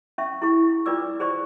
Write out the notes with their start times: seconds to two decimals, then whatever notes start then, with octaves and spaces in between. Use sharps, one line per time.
0.18 C#4 E5 C#6
0.42 E4 G#4 C#6
0.86 D4 F4 B4 D5 D6 E6
1.20 G#4 C5 D5 C#6